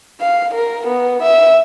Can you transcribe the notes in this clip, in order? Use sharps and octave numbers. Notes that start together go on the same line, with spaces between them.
F5
A#4
B3
E5